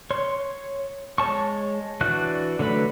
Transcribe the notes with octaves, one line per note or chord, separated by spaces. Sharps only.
C#5 C6
G#3 C#5 A5 C#6
E3 D4 F#4 F#6
D3 F#3 A3 B4 B5